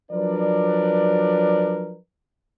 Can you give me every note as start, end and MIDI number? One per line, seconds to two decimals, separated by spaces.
0.12 1.96 53
0.12 1.96 54
0.12 1.96 62
0.12 1.96 70
0.12 1.96 71
0.12 1.96 74